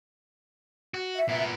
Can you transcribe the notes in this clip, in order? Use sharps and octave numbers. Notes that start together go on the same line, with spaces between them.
F#4
E5
A#2 B3